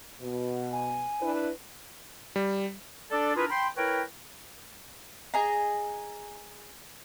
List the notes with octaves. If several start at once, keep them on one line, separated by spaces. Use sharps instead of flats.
B2
G#5
D4 E4 B4
G3
D4 A4 D5
D4 E4 F4 G#4 A#4 B4
G5 B5 C6
E4 A#4 B4 C#5 G5
G#4 D#5 A#5